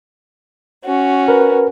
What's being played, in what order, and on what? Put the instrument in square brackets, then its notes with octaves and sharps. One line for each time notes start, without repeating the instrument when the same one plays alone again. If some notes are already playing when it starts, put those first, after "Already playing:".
[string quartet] C#4 F#4
[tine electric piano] A#4 B4